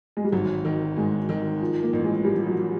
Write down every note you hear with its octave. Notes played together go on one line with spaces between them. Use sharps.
G#3
G3
G#1 F#3
D#3
G#2 G#3
D#3
F3
A#3
A1
G#3
F3 G3
F#3